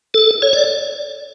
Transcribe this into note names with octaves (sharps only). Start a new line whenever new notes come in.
A4
C#5
D5